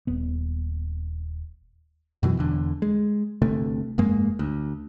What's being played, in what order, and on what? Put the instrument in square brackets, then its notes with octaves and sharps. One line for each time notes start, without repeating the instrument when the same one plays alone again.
[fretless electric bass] D#1 B3
[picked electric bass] F#2 B2 E3 F#3
E1 E2 D3
G#3
G1 D2 C3 A3
F1 G2 G#3 A#3
D2